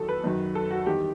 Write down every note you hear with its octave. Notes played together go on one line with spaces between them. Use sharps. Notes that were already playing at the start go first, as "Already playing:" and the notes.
Already playing: E2 D#3 F#3 A4
B4
F#2 D#3 F#3
A4
F#4
E2 D#3 G3 G4